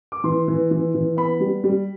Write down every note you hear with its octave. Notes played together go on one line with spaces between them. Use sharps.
D6
E3 C6
E3
E3
E3
B3 B5
G3
G3